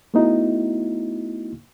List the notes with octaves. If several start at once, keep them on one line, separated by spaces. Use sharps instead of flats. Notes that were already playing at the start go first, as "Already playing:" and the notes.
A3 B3 D#4 E4 F#4